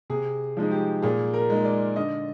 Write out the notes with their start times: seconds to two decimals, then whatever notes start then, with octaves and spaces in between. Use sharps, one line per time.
0.10 C3 G#4
0.57 F3 G#3 D#4
0.71 G4
1.03 A#2 G#4
1.34 A#4
1.50 G#3 D#4
1.65 D5
1.96 D3 D#5